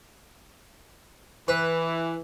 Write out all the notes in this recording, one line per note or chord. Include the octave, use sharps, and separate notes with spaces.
E3 B4